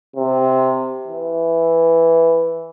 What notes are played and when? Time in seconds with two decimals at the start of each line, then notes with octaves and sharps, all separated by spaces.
0.16 C3
1.07 E3